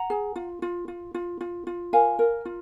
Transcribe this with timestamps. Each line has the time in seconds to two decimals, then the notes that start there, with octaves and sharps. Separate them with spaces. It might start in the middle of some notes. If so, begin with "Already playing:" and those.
Already playing: F#5 A#5
0.10 G#4
0.36 F4
0.62 F4
0.88 F4
1.14 F4
1.41 F4
1.67 F4
1.93 A#4 F5 G#5
2.19 A#4
2.45 F4